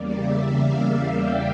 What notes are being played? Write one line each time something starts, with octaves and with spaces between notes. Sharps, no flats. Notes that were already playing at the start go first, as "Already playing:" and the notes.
Already playing: E2 C#3 G3 A#3 D5
E5
F5
F5
G5